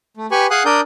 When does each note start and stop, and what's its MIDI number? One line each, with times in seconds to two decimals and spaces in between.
0.17 0.26 57
0.31 0.47 67
0.31 0.47 71
0.31 0.47 80
0.31 0.47 83
0.31 0.47 85
0.51 0.63 68
0.51 0.63 77
0.51 0.63 78
0.51 0.63 80
0.51 0.63 87
0.51 0.63 90
0.65 0.81 62
0.65 0.81 70
0.65 0.81 74
0.65 0.81 87
0.65 0.81 91